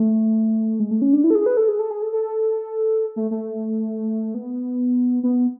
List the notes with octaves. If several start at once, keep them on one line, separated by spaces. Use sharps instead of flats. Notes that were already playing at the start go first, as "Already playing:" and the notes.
Already playing: A3
G#3
A3
C#4
D4
E4
A4
G#4
B4
A4
G#4
A4
G#4
A4
A4
A3
A3
B3
B3